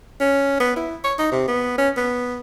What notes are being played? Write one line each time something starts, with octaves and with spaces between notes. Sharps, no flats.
C#4
B3
E4
C#5
D#4
C3
B3
C#4
B3